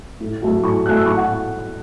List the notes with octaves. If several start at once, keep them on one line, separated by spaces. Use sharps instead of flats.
A2
F#3 A3
A2 C#6
F#3 A3 F#6
E6
A2 C#6
F#5